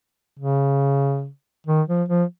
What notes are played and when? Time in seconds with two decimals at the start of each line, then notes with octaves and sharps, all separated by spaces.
0.39 C#3
1.67 D#3
1.88 F3
2.09 F3